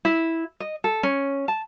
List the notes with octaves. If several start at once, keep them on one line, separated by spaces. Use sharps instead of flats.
E4
D#5
A4
C#4
A5